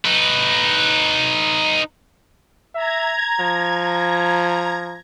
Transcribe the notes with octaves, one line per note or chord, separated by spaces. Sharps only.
D#4 B4
E5 A#5 G#6
F3